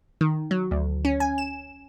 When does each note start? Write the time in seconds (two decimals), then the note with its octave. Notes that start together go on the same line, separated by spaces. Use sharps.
0.21 D#3
0.51 F#3
0.71 D2
1.05 C#4
1.20 G#5
1.38 E7